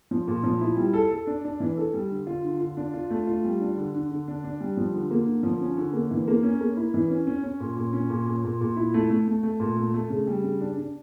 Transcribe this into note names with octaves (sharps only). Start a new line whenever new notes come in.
F3
A#2
F3
E4
G3
A4
A4
D4
D4
E3
A4
G3
D3
F4
D3
F4
D4
F4
A3
F4
G3
D4
D3
D3
D3
D4
D4
G3
F3
D3
A#3
D3
F3
C#4
D3
A#3
E3
A#3
C#4
A#3
E4
E3
C#4
C#4
C#4
A#2
A#2
C#4
A#2
A#2
A#2
A#2
E4
A3
A3
A3
A3
A#2
A3
A3
C#3
G3
C#3
D4
D4